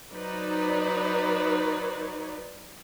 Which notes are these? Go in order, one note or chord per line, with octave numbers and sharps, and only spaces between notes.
F#3 D#4 B4 C5 D5